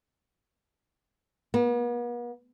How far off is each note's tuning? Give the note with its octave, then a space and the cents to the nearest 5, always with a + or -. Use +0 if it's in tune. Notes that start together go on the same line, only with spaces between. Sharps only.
B3 -45